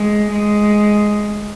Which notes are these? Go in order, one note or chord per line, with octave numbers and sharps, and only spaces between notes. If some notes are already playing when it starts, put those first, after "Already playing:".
Already playing: G#3
G#3